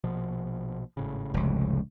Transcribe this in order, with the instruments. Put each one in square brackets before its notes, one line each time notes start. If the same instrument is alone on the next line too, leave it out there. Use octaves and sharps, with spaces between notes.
[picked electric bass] A#1 B2 F3
G#1 A2 C#3
[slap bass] F1 C#2